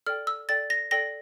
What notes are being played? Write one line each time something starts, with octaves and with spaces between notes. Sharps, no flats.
A4 D5 G5 F6
E6
A4 D5 G5 A6
A#6
A4 D5 G5 A#6